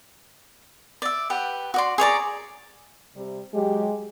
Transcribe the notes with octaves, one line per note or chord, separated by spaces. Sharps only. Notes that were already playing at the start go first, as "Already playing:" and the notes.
D5 E5
G4 B4 F#5
F#4 D5 C6
G#4 C#5 D5 A#5
C3 G3
F#3 G#3 G4